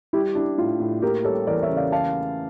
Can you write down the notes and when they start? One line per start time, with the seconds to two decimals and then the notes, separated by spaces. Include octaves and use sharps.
0.13 G3 E4 G4
0.35 D4 E4
0.58 A2 F4
0.80 A2
1.02 A#3 G4 A#4
1.25 G3 A4 C#5
1.47 E2 A#4 D5
1.63 C#5 E5
1.70 C#3
1.77 D5 F5
1.92 F5 A5